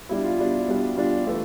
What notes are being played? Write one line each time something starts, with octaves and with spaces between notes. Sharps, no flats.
B2 G3 D4 E4
F4
B2 G3 D4
B2 G3 D4
B2 G3 D4 F4
E3 A3 D4